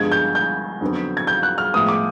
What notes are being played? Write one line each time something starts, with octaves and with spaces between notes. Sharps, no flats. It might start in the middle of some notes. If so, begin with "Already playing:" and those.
Already playing: G2 D3 F3 G#3 B3 G#6
G6
G6
F2 D3 F#3 B3
G#6
G6
F#6
F6
A2 F3 G#3 B3 D#6
D6